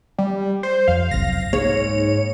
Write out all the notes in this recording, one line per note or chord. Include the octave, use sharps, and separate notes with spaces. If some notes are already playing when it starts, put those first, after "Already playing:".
G3
C5
F2 F5
F#1 C2 A#6
G#2 A#3 C#5